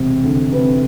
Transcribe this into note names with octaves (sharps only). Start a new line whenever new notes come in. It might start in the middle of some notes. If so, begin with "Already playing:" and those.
Already playing: E1 C3
D2
C3 B4